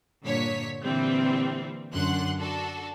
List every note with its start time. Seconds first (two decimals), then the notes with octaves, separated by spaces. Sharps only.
0.24 G2 A#2 D3 C#5 B6
0.83 A#2 D3 E3 G3 C4
1.93 F#2 D3 F#5 C6 F#6
2.39 D4 F#4 A4